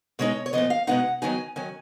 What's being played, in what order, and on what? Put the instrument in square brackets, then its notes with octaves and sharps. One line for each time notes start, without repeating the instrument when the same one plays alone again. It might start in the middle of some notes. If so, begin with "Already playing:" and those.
[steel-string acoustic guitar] B2 G#3 D#4 C#5
C#5
A#2 F3 B3 D#5
F5
B2 G#3 B3 D#4 F#5
D#3 F#3 B3 D#4 G#5
D#3 F#3 C#4 G#5